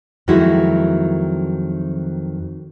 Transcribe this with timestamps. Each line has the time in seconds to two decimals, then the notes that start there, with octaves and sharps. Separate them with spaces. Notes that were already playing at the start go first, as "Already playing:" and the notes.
0.28 F2 D#3 F#3 G#3 E4 F#4